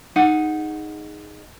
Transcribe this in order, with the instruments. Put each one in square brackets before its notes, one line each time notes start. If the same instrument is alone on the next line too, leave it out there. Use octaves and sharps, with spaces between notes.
[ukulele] D#4 G#4 F#5